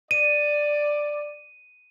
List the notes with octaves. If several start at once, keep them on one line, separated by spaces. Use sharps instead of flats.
D5 D#7